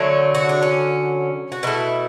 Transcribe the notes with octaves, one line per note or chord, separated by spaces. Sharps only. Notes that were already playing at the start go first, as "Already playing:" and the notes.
Already playing: D3 F#3 A3 C#5
F#4
D4
C#4
F#4
B2 A3 E4